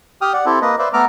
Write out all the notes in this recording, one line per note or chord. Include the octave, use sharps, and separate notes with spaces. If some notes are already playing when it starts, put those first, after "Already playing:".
G4 G5 D#6 F6
D5 F#5
C4 E4 G4 A4
A#3 B4 D#5
B4 C5 D5 E5
A3 B3 A4 A#5 D6 F6